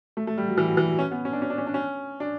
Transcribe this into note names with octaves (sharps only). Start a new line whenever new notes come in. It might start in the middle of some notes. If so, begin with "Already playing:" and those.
A3
A3
G3
F#3
E3
F#3
E3
F#3
C#4
B3
C#4
D4
C#4
D4
C#4
D4
C#4
D4